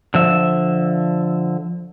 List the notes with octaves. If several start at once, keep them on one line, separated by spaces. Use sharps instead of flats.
D3 F3 E5